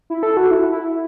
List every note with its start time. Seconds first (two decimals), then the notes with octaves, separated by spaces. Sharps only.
0.10 E4
0.23 A4
0.37 F#4
0.51 E4
0.72 E4